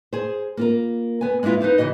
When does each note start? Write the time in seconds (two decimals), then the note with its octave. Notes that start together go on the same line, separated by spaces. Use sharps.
0.13 G#4 C5
0.57 A#3 F4 A#4
1.21 B3 G#5
1.43 G#3 A#3 B3 E4 F4
1.61 D#4 B4 C5 F5
1.78 C#3 E3 F#4 D#5